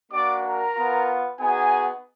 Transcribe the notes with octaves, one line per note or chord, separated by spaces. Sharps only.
A#3 D4 F#4 D5 D6
A#4 A#5
B3 F4
B3 D#4 F#4 G#4 G#5